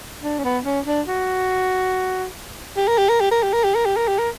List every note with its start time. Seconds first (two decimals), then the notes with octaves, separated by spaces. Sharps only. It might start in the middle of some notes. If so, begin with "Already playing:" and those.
0.23 D4
0.38 C#4
0.44 B3
0.65 C#4
0.86 D4
1.07 F#4
2.77 G4
2.88 A#4
2.98 G4
3.09 A#4
3.21 G4
3.31 A#4
3.43 G4
3.53 A#4
3.64 G4
3.75 A#4
3.86 G4
3.96 A#4
4.08 G4
4.18 A#4